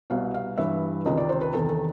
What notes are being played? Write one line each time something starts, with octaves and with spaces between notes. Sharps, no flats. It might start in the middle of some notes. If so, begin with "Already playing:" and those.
C2 B2 F5
F5
G2 E3 E5
C#2 C3 D#3 D#5
D5
C5
B4
E2 C3 D#3 A4
A4